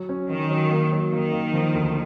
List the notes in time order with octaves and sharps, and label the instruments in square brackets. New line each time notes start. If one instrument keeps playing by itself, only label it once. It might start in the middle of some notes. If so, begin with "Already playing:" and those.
Already playing: [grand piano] F#3
C#4
[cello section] D#3 [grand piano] C#4
[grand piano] F#3
A#3
F#3
[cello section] D#3 [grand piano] A#3
[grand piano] A#3
F3
D2